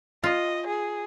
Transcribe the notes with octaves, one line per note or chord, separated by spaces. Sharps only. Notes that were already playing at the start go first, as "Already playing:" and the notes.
F4 D#5
G#4